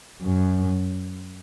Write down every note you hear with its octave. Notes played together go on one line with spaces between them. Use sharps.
F#2